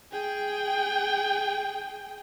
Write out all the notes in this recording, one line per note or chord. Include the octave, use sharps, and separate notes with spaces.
G#4 G5